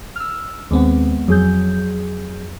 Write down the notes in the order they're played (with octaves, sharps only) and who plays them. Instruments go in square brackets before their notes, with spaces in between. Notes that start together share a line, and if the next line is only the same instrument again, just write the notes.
[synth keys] E6 F6
[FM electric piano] D#2 C4 [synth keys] G#3 B3
[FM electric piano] F2 [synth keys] F#3 G#4 G6